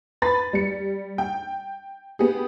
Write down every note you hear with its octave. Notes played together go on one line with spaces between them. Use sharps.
B4 B5 A6
G3 C#7
G5
B3 G4 G#4